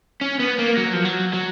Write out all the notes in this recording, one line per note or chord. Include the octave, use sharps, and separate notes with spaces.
C#4
B3
A#3
F#3
F3
F#3
F#3